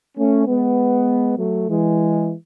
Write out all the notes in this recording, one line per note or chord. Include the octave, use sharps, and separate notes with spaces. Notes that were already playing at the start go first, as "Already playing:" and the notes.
A3 C#4
G#3 B3
F#3 A3
E3 G#3